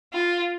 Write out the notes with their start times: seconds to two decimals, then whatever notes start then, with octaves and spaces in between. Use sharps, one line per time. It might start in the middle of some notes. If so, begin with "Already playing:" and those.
0.13 F4